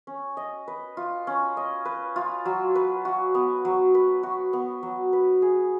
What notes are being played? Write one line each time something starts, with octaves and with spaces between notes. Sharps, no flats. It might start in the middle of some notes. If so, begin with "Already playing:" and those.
C#4
D#5
B4
F4
C#4
D#5
B4
F4
F#3
B4
F#4
B3
F#3
B4
F#4
B3
F#3
B4
G#4